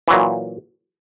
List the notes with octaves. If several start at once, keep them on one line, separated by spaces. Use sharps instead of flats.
A#2 E3 F#3